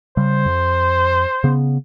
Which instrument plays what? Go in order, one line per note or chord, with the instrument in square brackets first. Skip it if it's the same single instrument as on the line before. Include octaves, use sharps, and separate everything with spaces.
[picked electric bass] C#3 G3 [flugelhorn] C5
[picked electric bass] F2
C#3 B3